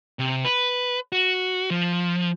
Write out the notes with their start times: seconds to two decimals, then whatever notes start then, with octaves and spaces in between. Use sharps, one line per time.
0.19 C3
0.45 B4
1.13 F#4
1.70 F3